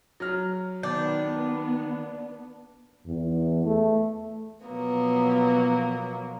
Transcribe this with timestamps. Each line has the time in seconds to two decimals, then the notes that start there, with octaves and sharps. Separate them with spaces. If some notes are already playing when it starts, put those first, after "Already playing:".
0.20 F#3 F6
0.83 D#3 B3 D4 A5 G6
3.06 E2
3.65 A3
4.66 B2 F3 F#3 A#3 B3